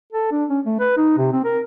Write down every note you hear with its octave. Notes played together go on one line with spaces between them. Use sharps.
A4
D4
C#4
A3
B4
D#4
C3
C4
A#4